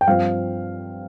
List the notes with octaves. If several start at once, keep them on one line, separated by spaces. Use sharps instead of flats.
G5
G2 F3 C4 F5